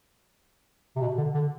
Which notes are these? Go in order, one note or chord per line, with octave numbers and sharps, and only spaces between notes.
C3
B2
D3
D3